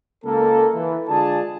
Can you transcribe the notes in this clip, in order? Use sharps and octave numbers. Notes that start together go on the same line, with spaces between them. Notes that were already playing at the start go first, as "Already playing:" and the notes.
C#2 A#3 A4
E3
D3 G#3 F4 G#4 D5 A5